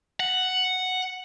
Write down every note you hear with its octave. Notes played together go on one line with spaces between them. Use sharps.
F#5